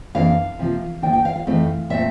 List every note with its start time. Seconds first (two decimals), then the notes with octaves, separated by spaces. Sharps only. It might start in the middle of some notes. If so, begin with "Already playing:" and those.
0.15 F2 E3 A#3 D4 F5
0.59 C3 F3 A#3
1.02 D3 F3 A#3 D4 G5
1.13 G5
1.25 F5
1.36 F5
1.47 F2 E3 A3 C4
1.90 A#2 A3 C4 E5